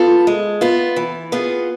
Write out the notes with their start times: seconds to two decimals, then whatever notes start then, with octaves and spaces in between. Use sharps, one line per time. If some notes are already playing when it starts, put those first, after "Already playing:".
Already playing: B3 F4 A4
0.27 G#3
0.61 B3 F4
0.96 E3
1.32 B3 F4 G#4